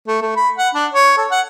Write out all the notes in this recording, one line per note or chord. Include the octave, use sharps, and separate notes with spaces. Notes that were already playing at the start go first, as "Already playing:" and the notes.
A3
A3
B5
F#5
D4
C#5
A4
F#5